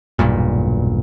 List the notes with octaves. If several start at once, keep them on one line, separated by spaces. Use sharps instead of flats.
E1 B1 G2 A#2